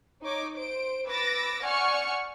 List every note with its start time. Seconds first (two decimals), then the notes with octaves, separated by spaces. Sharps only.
0.23 D#4 C#5 D6
0.57 C5 D7
1.07 B4 D6 E6 A6 A#6 D7
1.62 D5 F#5 G#5 C#6 F6 C#7